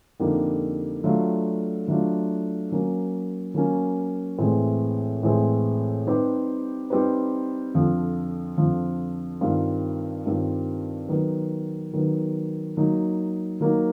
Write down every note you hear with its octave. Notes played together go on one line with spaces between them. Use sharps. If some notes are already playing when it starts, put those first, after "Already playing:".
F2 D3 G3 A#3 D#4
F#3 A3 D4 F4
F#3 A3 D4 F4
F#3 A#3 C#4
F#3 A#3 C#4
A2 E3 G#3 C4
A2 E3 G#3 C4
G3 C4 D#4 G4 B4
G3 C4 D#4 G4 B4
F2 D3 F3
F2 D3 F3
G2 D#3 G3 C4 F4
G2 D#3 G3 C4 F4
D#3 F#3 B3
D#3 F#3 B3
F#3 A#3 D#4
F#3 A#3 D#4